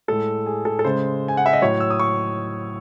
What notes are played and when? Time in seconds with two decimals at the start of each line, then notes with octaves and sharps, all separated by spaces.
0.08 A2 G#3 A4
0.46 G#4
0.65 A4
0.79 A4
0.85 C#3 G#3 C5
1.28 G#5
1.37 F#5
1.46 E5
1.53 D#5
1.62 A2 F#3 C#5
1.80 E6
1.90 D#6
1.99 C#6